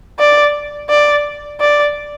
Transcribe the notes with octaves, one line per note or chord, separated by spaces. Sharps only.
D5
D5
D5